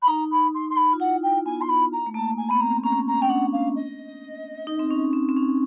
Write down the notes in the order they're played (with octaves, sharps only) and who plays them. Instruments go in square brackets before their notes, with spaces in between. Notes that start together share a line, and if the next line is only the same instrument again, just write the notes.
[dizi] B5
[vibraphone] D#4 [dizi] A#5
[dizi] B5
C6
C6
B5
[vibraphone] F4
[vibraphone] E4 [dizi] F#5
[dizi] G5
[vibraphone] B3 [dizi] G#5
[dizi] C6
B5
A#5
[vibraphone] A3
[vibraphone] A#3 [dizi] A5
[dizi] G#5
[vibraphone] B3 [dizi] B5
[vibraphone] C4 [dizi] A#5
[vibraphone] C#4 [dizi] A#5
[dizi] A#5
[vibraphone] C#4 [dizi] G5
[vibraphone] D4 [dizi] F#5
[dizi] F5
D#5
[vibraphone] D#4
C4
C#4
C4
C4
C#4